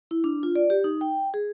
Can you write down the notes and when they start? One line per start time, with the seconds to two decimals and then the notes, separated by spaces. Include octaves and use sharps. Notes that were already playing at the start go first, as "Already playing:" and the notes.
0.11 E4
0.24 D4
0.43 F4
0.55 D5
0.70 G4
0.84 D#4
1.01 G5
1.34 G#4